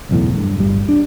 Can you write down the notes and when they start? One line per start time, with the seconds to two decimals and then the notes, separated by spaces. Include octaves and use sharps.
0.09 F#1 B1 E2 A2
0.36 G2
0.56 D1 G1 G3
0.89 D4